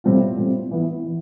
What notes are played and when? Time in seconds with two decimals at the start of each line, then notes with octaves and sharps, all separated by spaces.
0.04 A2 G3 C4 F4
0.37 A2 G3 C4 F4
0.71 E3 B3 E4
1.06 E3